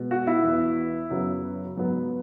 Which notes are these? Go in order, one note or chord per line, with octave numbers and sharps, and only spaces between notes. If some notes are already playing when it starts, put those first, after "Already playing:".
Already playing: B2 G#3 B3
F#4
E4
E2 E3 B3
F#2 C#3 F#3 B3
G#2 F#3 B3